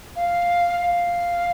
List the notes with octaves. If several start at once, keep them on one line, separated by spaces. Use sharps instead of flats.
F5
F5